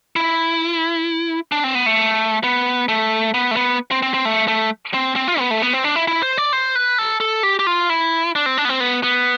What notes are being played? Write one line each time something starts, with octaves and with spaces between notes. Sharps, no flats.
E4
D4
C4
B3
A3
B3
A3
B3
A3
B3
C4
C4
C4
A3
A3
C4
C4
F4
B3
A3
B3
C4
D4
E4
E4
C5
D5
C5
B4
A4
A4
G4
G4
F4
E4
D4
C4
D4
B3
C4
B3
B3